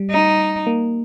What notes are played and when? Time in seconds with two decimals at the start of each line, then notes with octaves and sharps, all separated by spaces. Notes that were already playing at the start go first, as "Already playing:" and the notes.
Already playing: G3
0.11 D#4
0.67 A#3